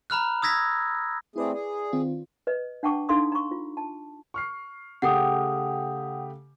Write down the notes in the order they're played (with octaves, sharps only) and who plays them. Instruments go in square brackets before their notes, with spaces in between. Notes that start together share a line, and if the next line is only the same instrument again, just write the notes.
[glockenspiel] A#5 B5 F6 F#6
D#6 E6 G#6 A#6 B6
[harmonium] A3 C4 G#4 [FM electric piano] E4 B4 D5
[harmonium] G#4
[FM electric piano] D#3 C4 F4
[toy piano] B4 D#5
D4 F#5 G5 A5 C#6 D6
D4 D#4 A4 F5 C6 D#6
A#5 C#6
F4
A5
[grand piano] C#6 F6 C7
[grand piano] C#3 A3 G4 [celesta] F#5 G5 D#6